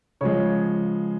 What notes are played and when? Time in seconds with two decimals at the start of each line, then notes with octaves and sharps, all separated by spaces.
0.21 C#3 F3 G#3 C#5